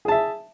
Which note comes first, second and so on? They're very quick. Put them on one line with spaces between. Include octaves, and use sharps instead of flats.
G#4 A5 E5